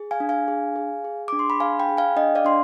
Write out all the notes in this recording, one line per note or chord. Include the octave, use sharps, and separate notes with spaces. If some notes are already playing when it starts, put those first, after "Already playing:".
Already playing: G#4
F5 G#5
D4
F5 G#5
G#4
G#4
G#4
D4 D6
C6
B5
G#4 F5 G#5
G5 B5
G#4
F5 G#5
D4 D#5 G5
D5 F5
D4 C6